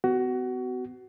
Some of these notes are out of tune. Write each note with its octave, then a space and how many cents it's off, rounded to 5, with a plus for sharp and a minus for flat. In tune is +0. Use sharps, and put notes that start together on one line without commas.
B3 +40 F#4 +20